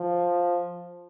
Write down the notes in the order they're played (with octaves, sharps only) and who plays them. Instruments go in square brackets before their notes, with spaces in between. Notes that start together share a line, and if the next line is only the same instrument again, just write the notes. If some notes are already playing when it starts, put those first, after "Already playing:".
Already playing: [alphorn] F3